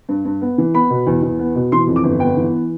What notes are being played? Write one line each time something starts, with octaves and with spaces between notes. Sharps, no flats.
G2
G2
B3
E3
B3 B5
B2
E2
E2
B3
B2
E3 C6
F2
D6
G1
B3 G5
E3